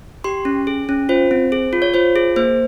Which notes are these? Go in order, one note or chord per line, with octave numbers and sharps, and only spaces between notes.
G4 C6
C#4
G#4
C#4
F4 C5
C4
G#4
F4
C#5
F4 C5
G#4
A#3 C5